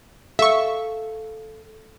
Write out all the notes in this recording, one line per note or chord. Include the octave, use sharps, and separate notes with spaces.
A4 E5 F5 C#6